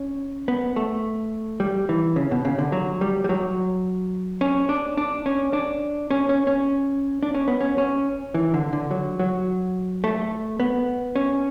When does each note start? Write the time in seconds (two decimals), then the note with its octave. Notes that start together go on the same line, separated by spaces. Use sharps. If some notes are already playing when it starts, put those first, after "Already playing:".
Already playing: C#4
0.48 B3
0.76 A3
1.60 G3
1.89 E3
2.16 C#3
2.31 B2
2.45 C#3
2.58 D3
2.72 F#3
3.01 G3
3.24 G3
3.29 F#3
4.41 C#4
4.69 D4
4.97 D4
5.26 C#4
5.53 D4
6.11 C#4
6.29 C#4
6.47 C#4
7.23 D4
7.34 C#4
7.48 B3
7.61 C#4
7.78 C#4
8.34 E3
8.54 D3
8.73 D3
8.91 F#3
9.20 F#3
10.04 A3
10.60 B3
11.16 C#4